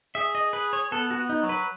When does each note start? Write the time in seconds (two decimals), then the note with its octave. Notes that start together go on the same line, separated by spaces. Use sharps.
0.15 G#4 E5
0.35 D#5
0.53 B4
0.73 C#5
0.92 B3 A4
1.11 F#4
1.17 B3
1.30 D#4
1.43 F#3
1.49 B4